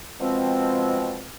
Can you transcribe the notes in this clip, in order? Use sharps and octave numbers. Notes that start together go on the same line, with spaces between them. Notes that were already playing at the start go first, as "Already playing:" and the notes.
B2 F3 G#3 C4